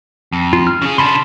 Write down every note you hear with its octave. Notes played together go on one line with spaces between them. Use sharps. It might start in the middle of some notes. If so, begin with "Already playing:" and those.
F2
F4
F6
C#3 G#4
C#3 D4 A5 B5 C6